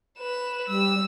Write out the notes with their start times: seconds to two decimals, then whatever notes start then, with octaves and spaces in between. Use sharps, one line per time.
0.18 B4 E7
0.68 G3 E6